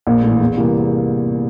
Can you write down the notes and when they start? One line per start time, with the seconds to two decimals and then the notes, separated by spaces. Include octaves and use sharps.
0.07 A#1
0.23 A2 E3
0.41 E2
0.57 C3 E3 G3 A#3